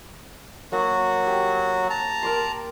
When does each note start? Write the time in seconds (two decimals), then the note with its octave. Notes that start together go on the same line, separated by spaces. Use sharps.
0.72 F#3 A#3 F#4 F#5 C#6
1.27 G4
1.90 A5 A#5
2.23 A#4 D5 C6